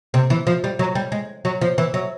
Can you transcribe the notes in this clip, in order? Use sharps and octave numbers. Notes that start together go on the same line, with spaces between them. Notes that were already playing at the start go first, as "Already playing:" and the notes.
C3
E3
F3
G3
F#3
G3
G#3
F#3
F3
E3
F#3